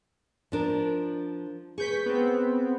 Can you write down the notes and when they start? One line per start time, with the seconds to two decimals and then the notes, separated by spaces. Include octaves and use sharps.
0.52 F3 D4 A#4
1.78 G#4 B4 C#6 G6 B6
2.06 B3 C4